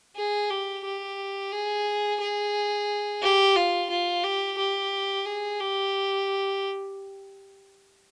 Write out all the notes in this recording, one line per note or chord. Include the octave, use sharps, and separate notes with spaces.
G#4
G4
G4
G#4
G#4
G4
F4
F4
G4
G4
G#4
G4